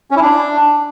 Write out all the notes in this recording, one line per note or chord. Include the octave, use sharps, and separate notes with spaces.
C#4
E4
D4